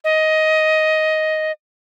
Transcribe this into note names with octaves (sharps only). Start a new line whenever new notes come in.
D#5